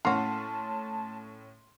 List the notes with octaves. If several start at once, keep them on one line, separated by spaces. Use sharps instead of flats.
A2 A#3 C#4 F#4 A5 C6 F6 C7